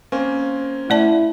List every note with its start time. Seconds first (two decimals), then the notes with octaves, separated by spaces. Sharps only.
0.12 A#3 C4 C#4
0.90 A3 E4 D5 A5